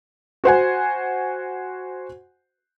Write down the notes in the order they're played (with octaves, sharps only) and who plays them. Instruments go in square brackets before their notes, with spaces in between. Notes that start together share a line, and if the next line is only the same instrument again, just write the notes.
[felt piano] F#4 C5 F#5 G#5